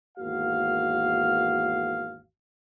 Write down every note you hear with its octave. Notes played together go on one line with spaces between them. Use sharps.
G#1 E2 A#3 F#4 F5